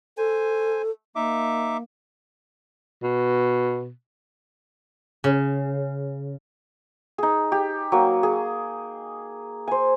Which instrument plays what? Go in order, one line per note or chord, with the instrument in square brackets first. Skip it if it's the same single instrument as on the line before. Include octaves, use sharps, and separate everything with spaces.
[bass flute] A4 [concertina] C5 G#5
[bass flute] A#3 [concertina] D#4 E5 D6
[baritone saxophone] B2
[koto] C#3
[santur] D#4 G#4
G4
F#3 A#3
G#4
C5 G#5